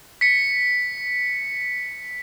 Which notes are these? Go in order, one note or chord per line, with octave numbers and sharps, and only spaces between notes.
B6 C#7